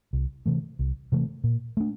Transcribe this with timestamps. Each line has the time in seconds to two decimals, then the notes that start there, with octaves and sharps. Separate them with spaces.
0.13 C2
0.46 C3 E3 A3
0.79 C2
1.12 C3 E3 A3
1.44 A#2
1.77 A3 D4